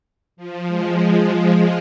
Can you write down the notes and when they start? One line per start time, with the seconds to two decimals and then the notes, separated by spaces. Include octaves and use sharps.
0.37 F3
0.67 G#3